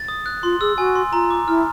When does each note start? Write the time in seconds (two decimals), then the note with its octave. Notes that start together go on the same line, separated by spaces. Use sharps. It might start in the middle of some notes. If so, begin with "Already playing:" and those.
Already playing: A6
0.08 D#6
0.26 F#6
0.43 F4 C6
0.61 G#4 E6
0.78 F#4 G#5
0.95 C6
1.13 F4 A#5
1.31 D6
1.48 E4 F6